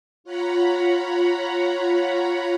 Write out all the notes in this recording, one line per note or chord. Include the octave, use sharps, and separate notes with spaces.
F4 C#5 F#5 A#5 B5